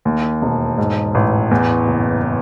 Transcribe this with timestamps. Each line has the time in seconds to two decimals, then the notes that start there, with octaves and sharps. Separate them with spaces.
0.05 D#2
0.42 E1
0.78 G#2
1.15 A1
1.51 E2
1.88 F#1